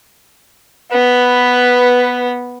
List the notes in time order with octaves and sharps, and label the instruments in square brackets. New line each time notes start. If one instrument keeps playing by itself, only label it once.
[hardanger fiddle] B3 [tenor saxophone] B4